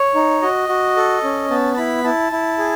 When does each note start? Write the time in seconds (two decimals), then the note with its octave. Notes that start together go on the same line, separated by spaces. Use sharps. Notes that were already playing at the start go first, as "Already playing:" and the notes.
Already playing: C#5
0.15 D#4
0.42 F#4 D#5
0.69 F#4
0.96 A4
1.23 C#4
1.50 B3 A5
1.74 A5
1.77 E4 B5
2.04 E4 A5
2.32 E4
2.58 G#4